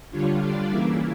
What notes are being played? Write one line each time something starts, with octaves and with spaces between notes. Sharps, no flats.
D3 G3 D4 F4 C#5
D5
C#3 E3 A#3 E4 E5